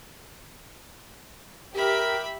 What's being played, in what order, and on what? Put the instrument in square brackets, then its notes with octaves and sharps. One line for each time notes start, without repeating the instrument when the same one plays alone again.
[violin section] G4 [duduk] A#4 [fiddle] E5 B5